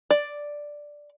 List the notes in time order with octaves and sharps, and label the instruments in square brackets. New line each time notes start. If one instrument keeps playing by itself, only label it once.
[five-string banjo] D5